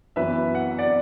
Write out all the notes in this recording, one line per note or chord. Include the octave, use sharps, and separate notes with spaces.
F#2 E3 B3 B4 E5
F#5
D5 F#5